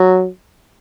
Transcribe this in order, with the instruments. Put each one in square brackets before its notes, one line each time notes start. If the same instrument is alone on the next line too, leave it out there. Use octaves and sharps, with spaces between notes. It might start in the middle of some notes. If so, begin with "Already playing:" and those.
Already playing: [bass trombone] F#3